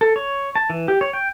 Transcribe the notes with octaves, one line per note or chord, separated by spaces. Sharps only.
A4
C#5
A5
E3
G4
C#5
G5